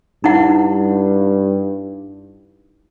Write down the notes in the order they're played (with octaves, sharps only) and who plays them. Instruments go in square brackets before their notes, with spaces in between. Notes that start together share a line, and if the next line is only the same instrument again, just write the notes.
[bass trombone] G2 [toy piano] D#4 E4 F#5